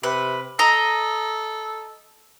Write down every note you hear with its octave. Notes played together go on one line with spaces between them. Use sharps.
C3 B4
A4 D#5 A#5